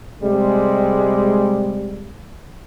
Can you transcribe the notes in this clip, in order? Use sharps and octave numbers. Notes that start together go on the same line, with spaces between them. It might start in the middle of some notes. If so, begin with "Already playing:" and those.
C3 G3 G#3